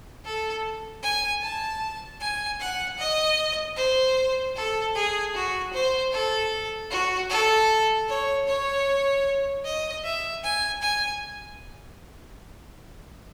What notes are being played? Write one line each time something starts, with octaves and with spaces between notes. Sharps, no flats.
A4
G#5
A5
G#5
F#5
D#5
C5
A4
G#4
F#4
C5
A4
F#4
A4
C#5
C#5
D#5
E5
G#5
G#5